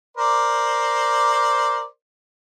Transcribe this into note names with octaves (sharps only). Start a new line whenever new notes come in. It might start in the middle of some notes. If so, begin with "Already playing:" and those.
A#4 C5 D5